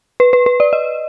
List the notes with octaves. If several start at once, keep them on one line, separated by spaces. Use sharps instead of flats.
B4
B4
B4
D5
D#5